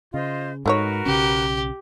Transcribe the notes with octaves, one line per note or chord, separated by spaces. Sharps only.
C#3 F4 C5 D#5
G#2 A3 D#4 F#4 A#4 B4 C#5
B1 C#3 C#4 G4